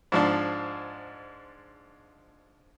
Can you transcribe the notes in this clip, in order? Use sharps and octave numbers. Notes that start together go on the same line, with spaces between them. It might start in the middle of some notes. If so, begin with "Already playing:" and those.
G#2 F3 D4